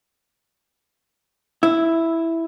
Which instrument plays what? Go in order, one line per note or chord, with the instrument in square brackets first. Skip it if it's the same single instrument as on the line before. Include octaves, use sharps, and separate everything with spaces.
[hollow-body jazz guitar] E4